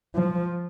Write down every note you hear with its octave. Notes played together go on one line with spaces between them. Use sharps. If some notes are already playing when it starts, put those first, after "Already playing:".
F3